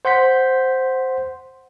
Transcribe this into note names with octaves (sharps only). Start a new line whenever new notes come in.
C5 F#5 C6 G6 B6